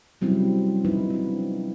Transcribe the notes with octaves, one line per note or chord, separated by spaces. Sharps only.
C3 F#3 G3 C4 C#4 E4
F3 G3 D#4 E4 B4
C4 D4